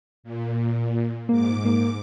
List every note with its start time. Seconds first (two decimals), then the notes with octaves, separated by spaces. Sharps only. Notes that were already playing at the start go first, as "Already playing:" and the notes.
0.23 A#2
1.29 G#2 A#3 D6
1.65 A#3